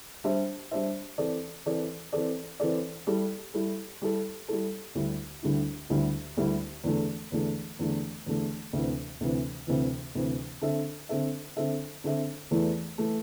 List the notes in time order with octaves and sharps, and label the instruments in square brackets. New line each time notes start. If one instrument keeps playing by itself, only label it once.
[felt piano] G3 D4 C5 E5
G3 D4 C5 E5
E3 C4 A4 D5
E3 C4 A4 D5
E3 C4 A4 D5
E3 C4 A4 D5
G3 E4 A4
G3 E4 A4
G3 E4 A4
G3 E4 A4
D2 D3 G3 E4
D2 D3 G3 E4
D2 D3 G3 E4
D2 D3 G3 E4
E2 D3 A3
E2 D3 A3
E2 D3 A3
E2 D3 A3
D2 C3 E3
D2 C3 E3
D2 C3 E3
D2 C3 E3
D3 C4 A4 E5
D3 C4 A4 E5
D3 C4 A4 E5
D3 C4 A4 E5
E2 E3 A3
E3 A3